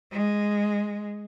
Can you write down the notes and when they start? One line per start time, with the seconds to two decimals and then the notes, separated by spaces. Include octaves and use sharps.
0.11 G#3